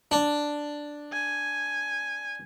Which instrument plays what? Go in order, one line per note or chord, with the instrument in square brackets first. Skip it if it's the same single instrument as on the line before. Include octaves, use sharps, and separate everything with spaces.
[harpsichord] D4
[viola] G#5